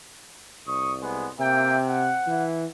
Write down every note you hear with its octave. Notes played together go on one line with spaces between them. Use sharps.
C2 C#6 D#6
G#3 B3
C3 A#3 E5 G5
F#5
E3